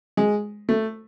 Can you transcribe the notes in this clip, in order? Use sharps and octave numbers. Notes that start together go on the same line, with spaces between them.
G#3
A3